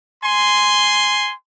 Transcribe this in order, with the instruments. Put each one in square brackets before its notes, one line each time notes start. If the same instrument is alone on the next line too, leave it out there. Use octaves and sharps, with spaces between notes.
[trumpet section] G#5 C6